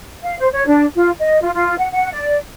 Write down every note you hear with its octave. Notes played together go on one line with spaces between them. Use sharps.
F5
C5
C#5
D4
F4
D#5
F4
F4
F#5
F#5
D5